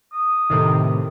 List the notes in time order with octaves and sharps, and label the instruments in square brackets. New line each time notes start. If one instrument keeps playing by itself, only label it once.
[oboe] D#6
[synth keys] A2 C3 D#3